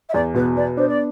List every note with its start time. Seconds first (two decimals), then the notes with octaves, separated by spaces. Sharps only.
0.09 E5
0.14 E2 D5
0.34 B2 B4
0.57 B3 D5
0.77 D4 C5
0.88 D5